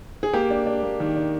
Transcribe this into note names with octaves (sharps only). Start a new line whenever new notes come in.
G#4
A#3 G4
D4
D4
A#3
D#3
D4